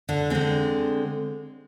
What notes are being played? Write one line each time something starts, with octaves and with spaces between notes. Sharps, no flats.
D3 D4
D3 G#3 C4